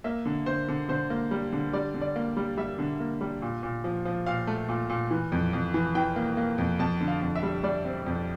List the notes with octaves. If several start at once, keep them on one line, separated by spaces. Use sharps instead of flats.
A#3 E5
D3
D3 C5
D3
D3 C5
A#3
G3
D3
G3 D5
D3
D5
A#3
G3
G3 E5
D3
A#3
G3
A#2
A#2
F3
F3
A#2 F5
A3
A#2
A#2
E3
F2
F2
E3
E3 G5
A#3
A#3
F2
F2 A5
D3
F5
F2
E5
G3
G3 D5
C4
F2